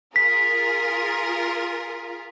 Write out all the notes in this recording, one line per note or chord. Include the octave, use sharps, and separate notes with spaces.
F4 G#4 A#4 B6